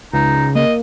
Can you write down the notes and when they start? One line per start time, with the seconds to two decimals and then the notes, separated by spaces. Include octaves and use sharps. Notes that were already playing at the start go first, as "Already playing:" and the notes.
0.13 C#2 D#4
0.55 A#3 D#5